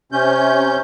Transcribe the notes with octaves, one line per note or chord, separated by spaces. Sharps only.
C3 C#4 G6